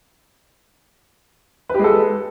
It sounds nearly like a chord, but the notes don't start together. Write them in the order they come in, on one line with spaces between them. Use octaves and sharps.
B4 G4 G#3 A4